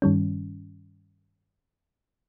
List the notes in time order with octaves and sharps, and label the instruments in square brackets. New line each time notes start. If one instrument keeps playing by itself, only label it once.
[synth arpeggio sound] G2 D#3 G3 C#4